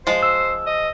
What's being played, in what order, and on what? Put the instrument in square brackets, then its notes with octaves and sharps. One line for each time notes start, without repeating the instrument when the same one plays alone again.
[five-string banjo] F3 G#3 [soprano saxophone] C5
[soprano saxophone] C5 [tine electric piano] E6
[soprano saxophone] D#5